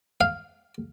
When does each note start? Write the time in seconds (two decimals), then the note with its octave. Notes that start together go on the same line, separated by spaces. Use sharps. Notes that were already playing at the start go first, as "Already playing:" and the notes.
0.21 F5